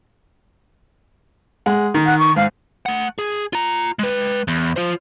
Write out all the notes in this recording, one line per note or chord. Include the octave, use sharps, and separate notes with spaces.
G#3 F#5
D#3
F#5
C#6
G#2 F5
A3 F#5
G#4
F4 A#5
G#3 B4
E2
F4 C5